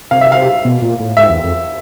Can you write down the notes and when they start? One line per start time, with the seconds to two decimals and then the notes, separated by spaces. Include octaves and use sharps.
0.11 C3 F5
0.21 E5
0.32 F5
0.65 B2
0.82 A#2
1.00 A2
1.17 G#2 E5
1.29 E2
1.43 F2